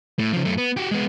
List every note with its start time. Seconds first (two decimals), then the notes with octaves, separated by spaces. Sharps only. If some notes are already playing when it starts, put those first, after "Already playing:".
0.19 A2
0.33 C#3 F3
0.45 F#2 A3
0.58 B3
0.77 F#4 G4
0.91 G#3 B3